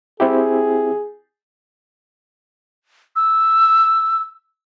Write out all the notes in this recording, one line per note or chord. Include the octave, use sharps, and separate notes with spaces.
C4 E4 G4 G#4
E6